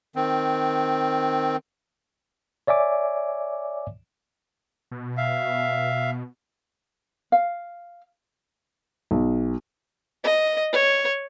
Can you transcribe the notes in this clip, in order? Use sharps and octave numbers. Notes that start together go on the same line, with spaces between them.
D#3 C4
C#5 D5 E5 G#5 D6
B2
E5 F5
F5
B1
D#5
C#5